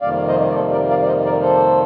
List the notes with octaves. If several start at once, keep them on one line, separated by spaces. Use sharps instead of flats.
F2 C3 D#3 G3 A#3 D5 F5
C5 D#5
D5
A4 C5
A#4 D5
D5 F5
D5
C5 D#5
A#4 D5
A4 C5